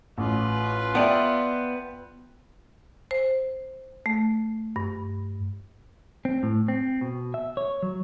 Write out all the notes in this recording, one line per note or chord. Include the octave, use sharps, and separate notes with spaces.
A1 F4 B4
B3 D5 E5 G5 A5
C5
A3
G2
C4
A2
C4
B2
E5
C#5
F#3